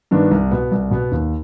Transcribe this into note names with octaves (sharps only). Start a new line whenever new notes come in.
G2 D#3 B3 D4
C2
B2 B3
C2
B2 B3
D#2